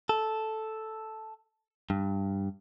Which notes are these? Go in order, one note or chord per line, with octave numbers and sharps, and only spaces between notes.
A4
G2